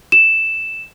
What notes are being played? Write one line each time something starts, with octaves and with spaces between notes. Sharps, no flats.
E7